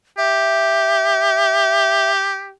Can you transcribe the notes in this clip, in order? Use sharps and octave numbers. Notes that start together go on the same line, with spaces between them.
G4 E5